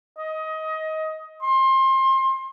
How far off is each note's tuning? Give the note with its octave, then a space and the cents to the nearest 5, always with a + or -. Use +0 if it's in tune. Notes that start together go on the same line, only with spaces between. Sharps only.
D#5 +20
C6 +30